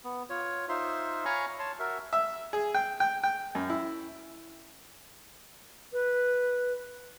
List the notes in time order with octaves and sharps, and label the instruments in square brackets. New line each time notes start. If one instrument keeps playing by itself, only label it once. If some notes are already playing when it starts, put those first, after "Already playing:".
[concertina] B3
F4 C#5
D#4 F4 C5 E5 C6
C#5 F5 G#5 A#5 B5 C#6
C#5 A5 C6
F#4 A#4 E5
[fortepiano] E5
G#4
G5
G5
G5
F#2
E4
[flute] B4